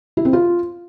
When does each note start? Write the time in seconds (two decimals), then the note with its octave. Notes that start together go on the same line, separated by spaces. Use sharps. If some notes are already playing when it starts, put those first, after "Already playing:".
0.17 E4
0.25 C4
0.33 F4